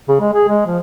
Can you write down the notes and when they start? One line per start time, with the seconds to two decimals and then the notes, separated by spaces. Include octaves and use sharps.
0.08 C#3
0.20 G#3
0.33 G#4
0.48 G#3
0.66 F3